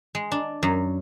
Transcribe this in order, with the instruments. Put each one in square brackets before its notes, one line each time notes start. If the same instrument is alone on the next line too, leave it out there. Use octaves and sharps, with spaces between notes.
[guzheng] G#3
D4
F#2